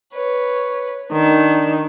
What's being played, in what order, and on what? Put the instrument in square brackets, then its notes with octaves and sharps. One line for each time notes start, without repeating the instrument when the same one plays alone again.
[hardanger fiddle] B4 C#5
[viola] D#3 [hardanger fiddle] D4